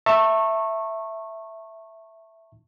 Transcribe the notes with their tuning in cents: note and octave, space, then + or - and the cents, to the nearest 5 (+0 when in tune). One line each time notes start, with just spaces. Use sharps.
E5 +0 A5 +35 C#6 -20